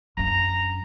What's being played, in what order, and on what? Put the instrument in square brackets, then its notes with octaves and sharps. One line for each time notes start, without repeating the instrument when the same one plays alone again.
[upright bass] F#2 D4 [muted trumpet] A#5